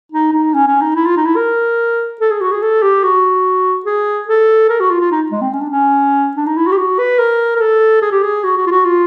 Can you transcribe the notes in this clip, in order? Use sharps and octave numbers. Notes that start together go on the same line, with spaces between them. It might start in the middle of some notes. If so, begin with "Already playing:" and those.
D#4
D#4
C#4
C#4
D#4
E4
F4
D#4
E4
A#4
A4
G#4
F#4
G#4
A4
G4
F#4
G#4
A4
A#4
F#4
F4
F4
D#4
G#3
C4
C#4
D4
C#4
D4
D#4
E4
F#4
G4
F#4
B4
A#4
A#4
A4
G#4
G4
G#4
F#4
F#4
F4
F#4
F4